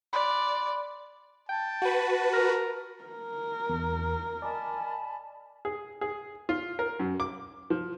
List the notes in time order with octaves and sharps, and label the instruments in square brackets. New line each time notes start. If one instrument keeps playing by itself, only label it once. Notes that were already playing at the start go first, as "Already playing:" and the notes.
[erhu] D5 [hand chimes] B5 C6 F#6
[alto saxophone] G5 [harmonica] A5
[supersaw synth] F#4 B4
[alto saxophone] A#4
[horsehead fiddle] A#4
[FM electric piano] E2
[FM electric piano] D5 D#5 [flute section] G#5 A5 B5
[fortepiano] G#4
G#4
F4
A#4
F#2
D6
F3